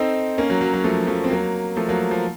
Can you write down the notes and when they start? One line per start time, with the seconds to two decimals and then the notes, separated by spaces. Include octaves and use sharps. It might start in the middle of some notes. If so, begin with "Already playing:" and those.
Already playing: C4 D#4 A4 C5
0.38 A#3 C#4
0.50 F#3
0.61 F#3
0.73 F#3
0.84 F3 A3
1.07 F3 A3
1.24 C4
1.30 F#3 A#3
1.76 F3 A3
1.89 F#3 A#3
2.11 F3